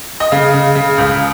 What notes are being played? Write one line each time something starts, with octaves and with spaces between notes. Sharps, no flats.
D#5
C#3 F5
C#3
C#3
C#2